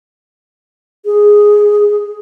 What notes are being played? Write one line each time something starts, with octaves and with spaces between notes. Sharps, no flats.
G#4